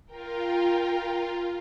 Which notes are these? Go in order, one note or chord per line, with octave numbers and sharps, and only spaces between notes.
F4 A#4 G5